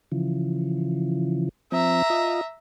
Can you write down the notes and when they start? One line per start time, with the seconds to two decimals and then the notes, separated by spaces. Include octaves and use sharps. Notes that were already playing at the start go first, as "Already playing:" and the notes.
0.12 C#3 E3 F3
1.72 F3 C4 E5 A#5
2.10 F4 D#5